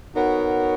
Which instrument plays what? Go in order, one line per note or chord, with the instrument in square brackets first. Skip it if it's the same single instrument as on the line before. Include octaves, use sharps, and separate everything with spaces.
[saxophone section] B3 D#4 F#4 A#4 C#5